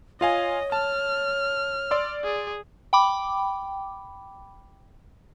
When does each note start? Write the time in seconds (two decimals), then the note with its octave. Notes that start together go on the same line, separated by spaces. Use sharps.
0.21 F4 C#5 D#5 F5 G#5
0.72 A5 F6
1.91 D5 C6 E6
2.24 G#4
2.93 G5 B5 D6